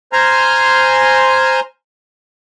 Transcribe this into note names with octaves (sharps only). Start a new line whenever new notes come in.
C5 G#5 A#5 C6 F6